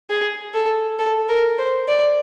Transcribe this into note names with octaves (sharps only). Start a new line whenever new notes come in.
G#4
A4
A4
A#4
C5
D5